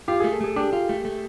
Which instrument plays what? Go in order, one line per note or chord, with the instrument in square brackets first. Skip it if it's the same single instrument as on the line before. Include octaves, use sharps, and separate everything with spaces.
[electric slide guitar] F4 [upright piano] G4
[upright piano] G#4
[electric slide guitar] A3
[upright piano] A4
[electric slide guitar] A3 [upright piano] G#4
[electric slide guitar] D4 [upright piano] G4
[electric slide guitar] F4
A3
A3